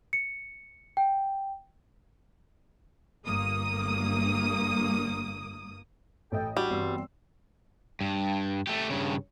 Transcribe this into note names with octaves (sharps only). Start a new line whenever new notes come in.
C#7
G5
G1 G2 A#3 D#6
A1 A4 D#5 G5
G3 D4 F#4
G1 E3 C4 C6 E6
G2
A3 G4
G2 C#3